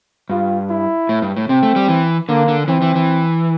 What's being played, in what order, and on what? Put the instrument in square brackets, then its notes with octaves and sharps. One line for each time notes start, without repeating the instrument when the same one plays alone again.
[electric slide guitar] G2 [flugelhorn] F4
[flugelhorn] E4
[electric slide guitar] A2
G2
A2
[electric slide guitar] C3 [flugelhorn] C4
[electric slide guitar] A3
G3
E3
[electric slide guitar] D3 [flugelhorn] A#3
[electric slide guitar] D3
[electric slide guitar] E3 [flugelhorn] C4
[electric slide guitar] E3
E3